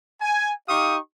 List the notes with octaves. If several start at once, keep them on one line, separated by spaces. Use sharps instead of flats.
G#5
D#4 G4 F5 C#6 D#6